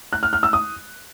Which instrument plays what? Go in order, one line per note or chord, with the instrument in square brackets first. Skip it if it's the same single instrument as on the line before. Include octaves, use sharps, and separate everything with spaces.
[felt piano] F#6
F6
F6
E6
D#6